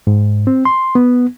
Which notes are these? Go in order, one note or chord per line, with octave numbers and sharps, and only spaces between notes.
G#2
C4
C6
B3